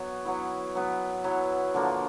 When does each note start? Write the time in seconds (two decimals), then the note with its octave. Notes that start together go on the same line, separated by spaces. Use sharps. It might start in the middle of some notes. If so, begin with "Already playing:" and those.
Already playing: F#3 B3 C#5
0.25 F#3 B3 E4
0.75 F#3 B3 E4
1.24 F#3 B3 E4 C#5
1.74 D3 F3 A#3 D4